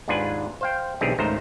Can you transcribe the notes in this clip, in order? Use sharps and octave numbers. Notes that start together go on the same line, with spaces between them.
D#2 G#2 D4 F4 B4 G#5
C5 F5 G5
B1 D3 E3 C4 G4 G#4
G#1 C#2 D#3 A3 C5 A#5